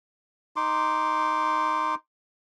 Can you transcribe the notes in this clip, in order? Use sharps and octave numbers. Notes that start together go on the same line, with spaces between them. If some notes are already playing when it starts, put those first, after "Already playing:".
D#4 C6 D6